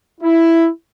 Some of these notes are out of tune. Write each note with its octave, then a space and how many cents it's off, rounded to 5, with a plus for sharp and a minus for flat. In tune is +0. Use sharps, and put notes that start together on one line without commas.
E4 +5